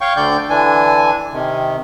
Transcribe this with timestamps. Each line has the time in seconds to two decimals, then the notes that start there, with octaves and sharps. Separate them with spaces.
0.01 C#5 F5 G5 C#6
0.16 D2 D3 D5 G5 G6
0.50 D3 E3 D4 G#5
1.33 C3 D#3